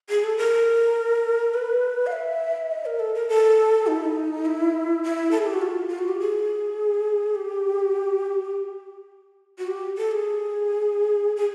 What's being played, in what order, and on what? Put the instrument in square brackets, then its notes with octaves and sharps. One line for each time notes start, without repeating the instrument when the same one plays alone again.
[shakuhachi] G#4
A4
A#4
B4
F5
E5
D#5
A#4
A4
A#4
A4
D#4
E4
D#4
E4
E4
A4
G#4
G4
F#4
F4
F4
F#4
G4
G#4
G4
F#4
G4
A4
G#4
G#4